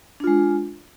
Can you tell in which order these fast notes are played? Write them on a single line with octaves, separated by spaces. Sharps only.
D4 F4 G#3